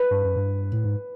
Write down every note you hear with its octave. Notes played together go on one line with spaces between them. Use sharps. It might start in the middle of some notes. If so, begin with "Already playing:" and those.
Already playing: B4
G2
F#2
G2
A2
G#2